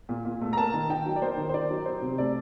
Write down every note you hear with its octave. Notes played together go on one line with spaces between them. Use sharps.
A#2
A#2
A3
A#5
A#3 A5
D#3
D#4 G5
F#3
D5
A#3 C5
D#3
C5
D#4 D5
F#3
F#3 C5
C3
A3 D5